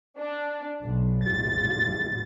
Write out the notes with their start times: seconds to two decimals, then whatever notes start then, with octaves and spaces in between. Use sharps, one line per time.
0.18 D4
0.83 B1
1.24 A6